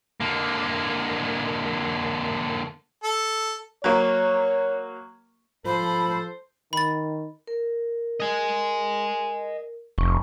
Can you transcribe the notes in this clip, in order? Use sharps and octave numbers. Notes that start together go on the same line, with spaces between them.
D3 A#3
A4
F#3 A#3 C#5
F3 A4 C5 B5
D#3 B5 A6
A#4
D#5 G#5
F1 C#6